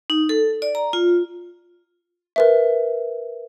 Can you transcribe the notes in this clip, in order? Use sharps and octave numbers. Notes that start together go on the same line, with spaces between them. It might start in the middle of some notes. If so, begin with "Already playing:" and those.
D#4
A4
D5
A#5
F4
A#4 B4 E5